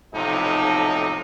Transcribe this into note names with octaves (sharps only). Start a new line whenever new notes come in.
B1 A2 C3 F3 D#4